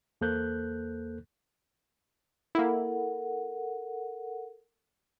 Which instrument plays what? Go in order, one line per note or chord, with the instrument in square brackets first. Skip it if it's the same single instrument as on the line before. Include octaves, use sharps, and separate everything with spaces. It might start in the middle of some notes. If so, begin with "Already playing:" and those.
[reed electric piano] E2 A#3 A4 C5 F#6 G6
[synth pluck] A#3 E4 [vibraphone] A4 A#4 F#5